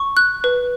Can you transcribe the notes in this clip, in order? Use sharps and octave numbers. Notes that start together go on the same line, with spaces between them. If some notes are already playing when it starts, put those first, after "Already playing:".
Already playing: C#6
F#6
B4